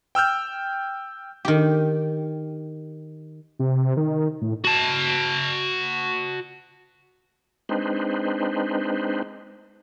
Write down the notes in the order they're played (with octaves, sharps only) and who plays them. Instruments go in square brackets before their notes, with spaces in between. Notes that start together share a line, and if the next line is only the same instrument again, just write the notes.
[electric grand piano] G5 E6 F6 G6
[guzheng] D#3 G4
[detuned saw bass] C3
D#3
A2
[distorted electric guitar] F#4 A5
[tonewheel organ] G#3 C4 D4 D#4 B4 C5